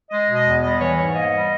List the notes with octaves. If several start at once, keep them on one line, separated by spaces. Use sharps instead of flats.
G#3 D#5
B2
D#5
E2
G3 D#5
E3 C#5
G#2 C#5
A#3 D#5
G3